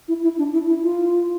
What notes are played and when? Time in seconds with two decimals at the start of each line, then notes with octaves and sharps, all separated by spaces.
0.08 E4
0.23 E4
0.38 D4
0.53 E4
0.67 E4
0.83 F4